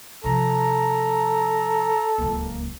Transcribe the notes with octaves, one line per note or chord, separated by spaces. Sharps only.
C3 F3 A4 A#5
D1 C#2 A#3